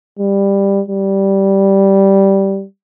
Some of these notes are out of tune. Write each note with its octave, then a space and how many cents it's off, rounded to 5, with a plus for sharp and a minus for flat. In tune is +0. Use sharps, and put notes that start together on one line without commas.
G3 +15
G3 -10